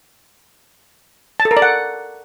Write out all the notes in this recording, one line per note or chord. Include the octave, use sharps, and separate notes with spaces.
A5
A4
A#4
D5
F#5